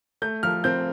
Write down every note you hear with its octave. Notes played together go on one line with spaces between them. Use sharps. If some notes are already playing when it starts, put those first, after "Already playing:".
A3 G6
F3 F6
C4 G6